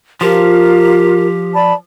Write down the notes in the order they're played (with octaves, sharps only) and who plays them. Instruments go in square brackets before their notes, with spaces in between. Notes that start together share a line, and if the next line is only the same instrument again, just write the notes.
[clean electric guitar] F3 [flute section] F4 A#4 [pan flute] G4
[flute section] D5 A5 B5